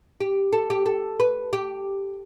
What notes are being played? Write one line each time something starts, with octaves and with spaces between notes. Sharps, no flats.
G4
A4
G4
A4
B4
G4